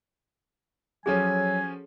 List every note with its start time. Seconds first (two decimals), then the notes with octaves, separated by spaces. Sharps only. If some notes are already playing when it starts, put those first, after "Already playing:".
1.06 F3 F#3 C#4 F#4 G#4 A4 C#5 G#5